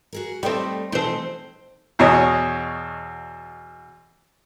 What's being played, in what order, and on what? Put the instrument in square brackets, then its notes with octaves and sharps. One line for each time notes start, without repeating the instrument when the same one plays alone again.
[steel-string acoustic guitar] F#4 G#4 A#4
[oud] G3 C4 [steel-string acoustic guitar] A3 D#4 [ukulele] A4 D#5 G5
[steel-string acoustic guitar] B2 E3 F3 [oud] C4 C5 [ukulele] D#4 A4
[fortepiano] E2 B2 C#5 D#5